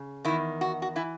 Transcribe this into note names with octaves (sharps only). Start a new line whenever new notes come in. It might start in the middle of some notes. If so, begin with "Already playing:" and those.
Already playing: C#3
E2 D#3 E4
F#4
F#4
E3 E4